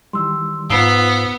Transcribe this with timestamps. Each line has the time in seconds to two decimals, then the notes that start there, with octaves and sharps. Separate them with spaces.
0.13 D#3 E3 G3 C6 E6
0.70 G#2 B3 F4 F5 D#6 E6 C7